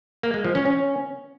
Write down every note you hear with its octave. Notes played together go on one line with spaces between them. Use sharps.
A#3
G#3
F3
C#4
C#4